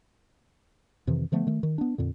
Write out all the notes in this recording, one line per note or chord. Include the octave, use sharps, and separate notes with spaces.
F2 C3 D#3 E3
D3 F3 A3 B3
D#3 A3
D#3
B3 D4
F2 A#2 D3